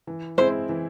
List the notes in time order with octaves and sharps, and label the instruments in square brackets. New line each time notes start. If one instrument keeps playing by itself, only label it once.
[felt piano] E3
[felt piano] G#3 C4 E4 [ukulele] C5
[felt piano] E3